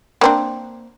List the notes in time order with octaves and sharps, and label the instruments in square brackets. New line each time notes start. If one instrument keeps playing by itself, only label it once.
[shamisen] A#3 C4 D4